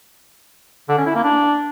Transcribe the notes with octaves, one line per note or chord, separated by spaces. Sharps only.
D3
C#4
E4
A#3
D4